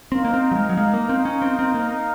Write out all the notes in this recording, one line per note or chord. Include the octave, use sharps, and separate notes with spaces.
C4 D#4 A#4 F5
A#3
C4
F#3
G#3
F#3
G#3
A#3
C4
C#4
C4
C4
A#3